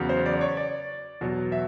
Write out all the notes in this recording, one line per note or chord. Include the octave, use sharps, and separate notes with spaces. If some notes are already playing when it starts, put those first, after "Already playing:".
Already playing: E2 C#3 F#3
C5
D5
D5
C#5
D5
E2 B2 F#3
E5